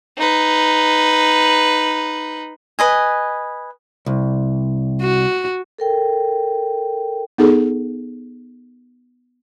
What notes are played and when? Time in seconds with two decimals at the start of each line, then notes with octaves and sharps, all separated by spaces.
0.18 D#4 B4
2.79 B4 D#5 G#5
4.06 C2
5.02 F#4
5.78 A4 A#4 G5
7.38 B3 D#4 G#4 A4